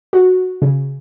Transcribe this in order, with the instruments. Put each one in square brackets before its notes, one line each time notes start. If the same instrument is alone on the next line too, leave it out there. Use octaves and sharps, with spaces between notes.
[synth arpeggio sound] F#4
C#3